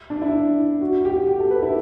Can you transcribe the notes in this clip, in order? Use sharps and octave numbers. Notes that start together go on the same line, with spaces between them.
D4
E4
F#4
G4
G4
A4
B4
E4